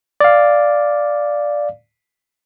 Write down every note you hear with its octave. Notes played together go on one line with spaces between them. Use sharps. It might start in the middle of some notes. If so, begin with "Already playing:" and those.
D5 F5